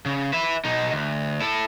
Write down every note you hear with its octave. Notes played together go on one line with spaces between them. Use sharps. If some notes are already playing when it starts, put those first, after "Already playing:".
C#3
B4 E5
B2 D#4
D2
E4 A4